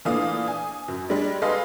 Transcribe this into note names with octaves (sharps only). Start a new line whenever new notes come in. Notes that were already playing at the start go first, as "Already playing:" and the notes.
A#2 E3 A3 D4 F5 D#6
G#5
F#2
G3 G#3 D4
G#4 A4 B4 D#5 F5 C6